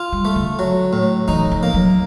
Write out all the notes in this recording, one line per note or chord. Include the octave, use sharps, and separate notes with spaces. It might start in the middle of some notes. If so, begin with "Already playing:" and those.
Already playing: F4
G3
A3
D3
F#3
A2
E3 D#4
E3
F3
A#3
F#3